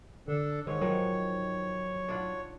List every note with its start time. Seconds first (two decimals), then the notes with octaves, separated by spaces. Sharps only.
0.28 D3 D4 A4
0.67 G#2 D#3 C#4 C#5
0.81 D#3 F3 F#3 F#5
2.08 D4 F4 F#5